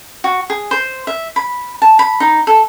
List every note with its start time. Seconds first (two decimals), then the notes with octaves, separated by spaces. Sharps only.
0.24 F#4
0.50 G#4
0.71 C5
1.07 E5
1.36 B5
1.82 A5
1.99 B5
2.20 D#4
2.47 A4